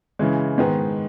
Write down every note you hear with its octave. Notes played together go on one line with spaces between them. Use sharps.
C#3 E3 G#3
G#2 D#3 G#3 B3